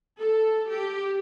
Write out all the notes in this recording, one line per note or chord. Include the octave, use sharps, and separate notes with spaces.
A4
G4